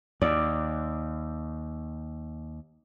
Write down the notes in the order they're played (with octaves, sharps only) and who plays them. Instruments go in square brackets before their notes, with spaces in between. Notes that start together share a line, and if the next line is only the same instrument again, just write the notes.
[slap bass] D#2 [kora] D5